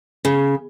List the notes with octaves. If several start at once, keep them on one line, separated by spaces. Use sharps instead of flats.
C#3